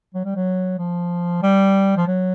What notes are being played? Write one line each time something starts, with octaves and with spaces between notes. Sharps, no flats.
F#3
G3
F#3
F3
G3
F3
F#3